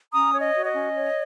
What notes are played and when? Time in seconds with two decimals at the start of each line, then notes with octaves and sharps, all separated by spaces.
0.13 C#4 A#5 D#6
0.33 C#5
0.40 D#5
0.53 F#4
0.66 D#5
0.73 C#4
0.93 C#5